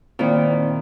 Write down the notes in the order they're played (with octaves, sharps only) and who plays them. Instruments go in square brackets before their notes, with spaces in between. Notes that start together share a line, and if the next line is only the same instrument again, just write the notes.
[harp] A#2 D#3 [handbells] C4 E4 C5